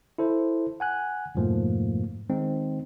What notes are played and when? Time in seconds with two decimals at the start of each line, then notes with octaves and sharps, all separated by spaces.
0.18 E4 A4 C5
0.80 F#5 G#5 F#6
1.35 F2 G#2 B2 F3 A3 A#3
2.29 D#3 G#3 C4 D#4